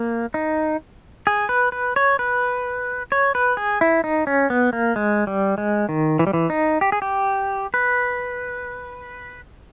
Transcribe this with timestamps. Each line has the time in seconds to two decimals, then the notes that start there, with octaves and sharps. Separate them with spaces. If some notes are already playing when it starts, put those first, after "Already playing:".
Already playing: A#3
0.34 D#4
1.27 G#4
1.49 B4
1.72 B4
1.96 C#5
2.19 B4
3.12 C#5
3.35 B4
3.57 G#4
3.81 E4
4.04 D#4
4.27 C#4
4.50 B3
4.73 A#3
4.96 G#3
5.27 G3
5.58 G#3
5.89 D#3
6.19 E3
6.27 G3
6.33 E3
6.50 D#4
6.81 G4
6.92 G#4
7.02 G4
7.74 B4